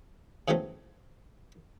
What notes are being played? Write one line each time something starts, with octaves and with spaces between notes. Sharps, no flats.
C#3 E3 F#3 A3 C4